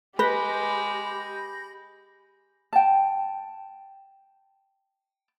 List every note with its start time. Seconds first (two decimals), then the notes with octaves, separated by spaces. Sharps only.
0.19 G#3 G4 B4 B5 G6 A#6
2.73 G5 A5